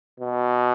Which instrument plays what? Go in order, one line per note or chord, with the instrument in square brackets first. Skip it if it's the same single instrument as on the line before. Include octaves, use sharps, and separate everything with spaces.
[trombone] B2